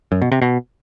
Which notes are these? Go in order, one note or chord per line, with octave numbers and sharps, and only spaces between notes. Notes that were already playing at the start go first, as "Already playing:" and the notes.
F#2
B2
C3
B2